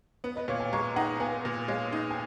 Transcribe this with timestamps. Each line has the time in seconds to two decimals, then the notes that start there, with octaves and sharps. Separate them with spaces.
0.24 B3 B4
0.36 B4 D#5
0.48 A#2 C#5 F5
0.60 F5 G#5
0.72 G#3 A#5 C#6
0.96 D#4 F#5 A#5
1.20 B3 F5 G#5
1.45 A#2
1.68 G#3 C#5 F5
1.92 D#4
2.11 G#5